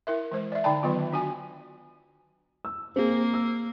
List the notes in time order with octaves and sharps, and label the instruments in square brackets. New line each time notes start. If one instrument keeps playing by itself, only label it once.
[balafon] E4 A#4 E5
E3 G#3 C5
D5 E5
D3 D#4 D5 G5 A5
D#3 F#3 B3 F4
D4 F#4 G#5
[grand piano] E6
[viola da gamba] A#3 [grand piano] C4 G#4
[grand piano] E6